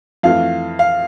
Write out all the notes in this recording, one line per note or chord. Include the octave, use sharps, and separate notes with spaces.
F2 E3 A3 F5
F5